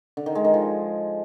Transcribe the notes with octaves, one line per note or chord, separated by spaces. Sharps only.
D3
D#3
G#3
D#3
F3